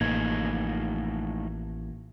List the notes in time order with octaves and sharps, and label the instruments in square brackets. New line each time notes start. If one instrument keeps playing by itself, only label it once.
[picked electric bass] A1 [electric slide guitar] F3 A3 D#4 [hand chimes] A#3 G#6